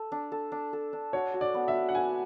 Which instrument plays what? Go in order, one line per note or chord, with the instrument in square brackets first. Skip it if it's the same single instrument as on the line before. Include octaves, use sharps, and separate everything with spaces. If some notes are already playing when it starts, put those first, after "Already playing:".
Already playing: [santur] A4
D4
A4
D4
A4
D4
[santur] F#4 [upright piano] C#5
[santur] F#4
[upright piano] D5
[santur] B3
[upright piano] E5
[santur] F#4
[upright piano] F#5
[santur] B4 [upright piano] G#5